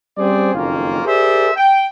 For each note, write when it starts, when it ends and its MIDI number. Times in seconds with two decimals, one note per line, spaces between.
0.18 0.54 55
0.18 0.54 60
0.18 0.54 61
0.18 0.54 68
0.18 0.54 72
0.18 0.54 74
0.54 1.02 30
0.54 1.02 41
0.54 1.02 51
0.54 1.02 58
0.54 1.02 61
0.54 1.02 65
1.05 1.50 67
1.05 1.50 68
1.05 1.50 70
1.05 1.50 72
1.05 1.50 74
1.05 1.50 76
1.54 1.84 79